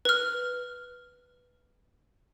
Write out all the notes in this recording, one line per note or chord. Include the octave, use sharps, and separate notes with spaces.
B4 F6